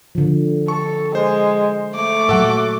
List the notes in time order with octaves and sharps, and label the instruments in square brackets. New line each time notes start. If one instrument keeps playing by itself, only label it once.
[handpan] D3 F3
[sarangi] A4 [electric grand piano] C#6
[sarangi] G#3 [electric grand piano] C5
[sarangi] A3 [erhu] D6
[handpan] A#2 F#3 [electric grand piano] A4 F#5